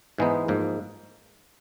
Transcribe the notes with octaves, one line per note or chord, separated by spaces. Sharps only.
G#2 E3 G#3 B3 D#4
G#2 F3 A#3